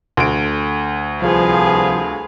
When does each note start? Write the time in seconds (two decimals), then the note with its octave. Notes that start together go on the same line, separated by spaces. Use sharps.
0.17 D2 D7
1.21 C2 F3 G#4 B4 F5